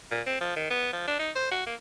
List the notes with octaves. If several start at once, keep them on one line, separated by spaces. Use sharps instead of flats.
A#2
C4
F3
D#3
B3
F3
D4
D#4
C5
F#4
A#3